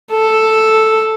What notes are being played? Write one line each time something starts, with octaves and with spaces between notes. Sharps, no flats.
A4